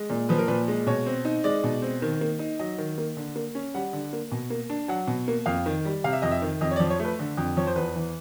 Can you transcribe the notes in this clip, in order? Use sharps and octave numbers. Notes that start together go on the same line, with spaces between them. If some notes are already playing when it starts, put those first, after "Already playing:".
Already playing: G#3
A#2
F3 B4
A#4
A#2 B4
G#3
B2 C#5
C4
D#4
G#3 D5
B2
C4
D#3
A#3
D#4
F#3 D#5
D#3
A#3
D3
A#3
C#4
G3 F#5
D3
A#3
B2
A#3
D4
F#3 F#5
B2
A#3
F2 F5
D#3
G3
C3 F5
E5
F2 D#5
E5
D#3
F2 D#5
C#5
D5
F3
C#5
A3
B4
D3
F2
F3 C#5
C5
E2 B4
E3